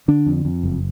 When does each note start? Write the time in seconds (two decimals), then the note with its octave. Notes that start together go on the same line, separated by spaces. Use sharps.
0.08 D3 D4
0.26 F2
0.45 F2
0.63 F#1